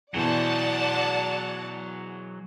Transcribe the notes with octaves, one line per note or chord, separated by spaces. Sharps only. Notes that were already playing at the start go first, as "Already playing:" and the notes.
E2 B2 E3 F#3 C5 D5 F#5 A5